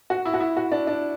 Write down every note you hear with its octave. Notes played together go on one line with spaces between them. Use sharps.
F#4
E4
F#4
E4
F#4
D4
D4